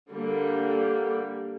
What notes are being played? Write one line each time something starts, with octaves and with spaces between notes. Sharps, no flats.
D3 G3 A#3